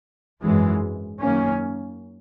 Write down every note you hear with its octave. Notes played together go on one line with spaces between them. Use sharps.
G#1 F#2 E3 G#3
F#2 D#3 A#3 C#4